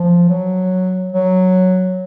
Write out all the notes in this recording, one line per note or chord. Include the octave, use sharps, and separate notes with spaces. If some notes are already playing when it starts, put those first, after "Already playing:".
Already playing: F3
F#3
F#3